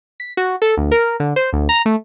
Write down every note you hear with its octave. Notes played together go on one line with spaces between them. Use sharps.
B6
F#4
A4
D2
A#4
D3
C5
D2
A#5
A3